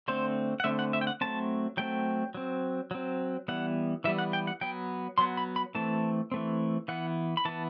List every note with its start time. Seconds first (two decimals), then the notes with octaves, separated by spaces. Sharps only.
0.08 D3 A3 C4 C5
0.60 F#5
0.64 D3 A3 C4 E5
0.79 F#5
0.93 E5
1.01 G5
1.07 F#5
1.21 F#3 A3 C4 A5
1.77 F#3 A3 C4 G5
2.35 F#3 C4
2.91 F#3 C4
3.48 E3 G3 B3 F#5
4.04 E3 G3 B3 E5
4.19 F#5
4.33 G5
4.47 F#5
4.61 F#3 B3 G5
5.18 F#3 B3 C6
5.37 B5
5.56 B5
5.75 E3 A3 C4 A5
6.32 E3 A3 C4
6.88 E3 B3 F#5
7.37 B5
7.45 E3 B3 A5